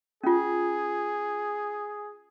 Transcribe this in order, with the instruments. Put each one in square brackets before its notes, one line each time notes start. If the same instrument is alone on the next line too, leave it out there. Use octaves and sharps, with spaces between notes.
[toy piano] C#4 F4 [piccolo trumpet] G#4